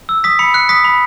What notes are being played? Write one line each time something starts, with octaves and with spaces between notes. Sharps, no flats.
E6
D#6 B6
B5 C#7
F#6 C#7
D#6 B6
B5